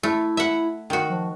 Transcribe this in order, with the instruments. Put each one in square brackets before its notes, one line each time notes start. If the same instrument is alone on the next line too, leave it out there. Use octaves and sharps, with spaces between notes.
[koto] A3 [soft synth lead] E4
[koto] E5 F#5
D#3 F#4
[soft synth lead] F3